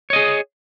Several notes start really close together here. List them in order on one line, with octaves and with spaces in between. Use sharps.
C#5 D#5 G#4